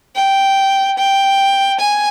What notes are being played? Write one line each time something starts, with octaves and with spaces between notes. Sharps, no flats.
G5
G5
G#5